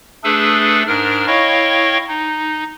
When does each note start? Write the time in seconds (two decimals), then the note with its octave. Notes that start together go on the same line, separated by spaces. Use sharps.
0.24 A3 D4 G#4 A4 B4
0.88 G#2 D4 A#4 F6
1.27 E4 C#5 D#5 F5 G5 C#6
2.08 D#4